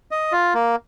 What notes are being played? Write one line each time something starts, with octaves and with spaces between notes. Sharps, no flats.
D#5
F4
A#3